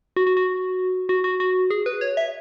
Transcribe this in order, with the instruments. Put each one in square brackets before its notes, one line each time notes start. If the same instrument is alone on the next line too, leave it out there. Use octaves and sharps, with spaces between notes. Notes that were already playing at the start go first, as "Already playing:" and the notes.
[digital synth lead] F#4
F#4
F#4
F#4
F#4
F#4
G#4
B4
C#5
E5